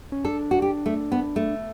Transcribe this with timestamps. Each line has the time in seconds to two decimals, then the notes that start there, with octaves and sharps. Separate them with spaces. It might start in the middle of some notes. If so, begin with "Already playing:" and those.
0.12 C#4
0.25 D4 A4
0.51 F#4
0.62 G4
0.86 A3
1.12 B3
1.36 A3